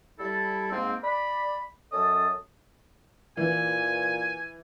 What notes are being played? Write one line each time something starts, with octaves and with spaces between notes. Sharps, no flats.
G3 E4 A4
G#2 A#3 C4
D5 B5
F#2 C#4 A4 D#5 A5 D#6
A#2 E3 G#5